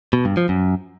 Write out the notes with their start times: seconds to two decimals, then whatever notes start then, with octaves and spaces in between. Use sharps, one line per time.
0.13 B2
0.25 G2
0.37 F3
0.49 F#2